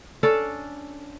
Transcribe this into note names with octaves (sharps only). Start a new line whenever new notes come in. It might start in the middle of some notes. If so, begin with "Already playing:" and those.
C#4 D4 A4 D5